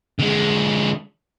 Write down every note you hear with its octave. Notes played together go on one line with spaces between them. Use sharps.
D3 G#3